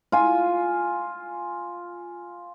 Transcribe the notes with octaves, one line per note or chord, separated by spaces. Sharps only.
F4 G#5